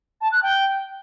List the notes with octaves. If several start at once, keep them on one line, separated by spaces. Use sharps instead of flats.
A5
F#6
G5